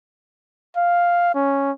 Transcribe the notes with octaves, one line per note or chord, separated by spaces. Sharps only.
F5
C#4